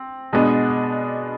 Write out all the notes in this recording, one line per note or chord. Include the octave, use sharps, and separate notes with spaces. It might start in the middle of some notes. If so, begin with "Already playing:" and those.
Already playing: C4
B2 G#3 B3 D4